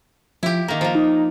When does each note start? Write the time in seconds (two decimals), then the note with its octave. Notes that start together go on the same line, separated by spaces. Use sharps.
0.43 F3 E4 G4
0.68 D#3 A#3 A#5
0.81 F3 A#3
0.95 D#4